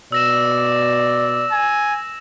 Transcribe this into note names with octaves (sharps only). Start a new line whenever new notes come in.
B2 D5 E6 A#6 E7
G#5